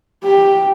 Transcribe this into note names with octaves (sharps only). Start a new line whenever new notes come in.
G4